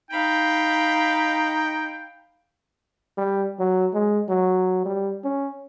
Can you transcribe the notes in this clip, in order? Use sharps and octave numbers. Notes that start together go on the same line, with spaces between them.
D#4 F5 G5 B5
G3
F#3
G#3
F#3
G3
C#4